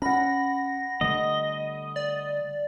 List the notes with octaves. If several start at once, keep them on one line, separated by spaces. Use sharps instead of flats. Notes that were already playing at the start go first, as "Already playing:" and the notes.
C#4 F#5 B5 A#6
D3 G3 A3 D#5
D5